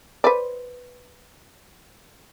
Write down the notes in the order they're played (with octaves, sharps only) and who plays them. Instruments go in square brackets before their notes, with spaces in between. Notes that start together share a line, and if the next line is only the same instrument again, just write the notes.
[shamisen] B4 C5 D5